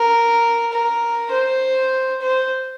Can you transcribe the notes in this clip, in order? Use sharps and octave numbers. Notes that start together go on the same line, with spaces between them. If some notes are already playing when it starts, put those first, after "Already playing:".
Already playing: A#4
A#4
C5
C5